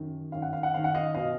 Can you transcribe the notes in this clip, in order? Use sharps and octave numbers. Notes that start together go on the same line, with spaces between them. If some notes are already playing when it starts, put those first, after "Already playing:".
Already playing: F#2 D#3
F#2 D#3 F5
F#5
F5
F#5
F#2 D#3 F5
F#5
D#5 F5
B2 D#5 F5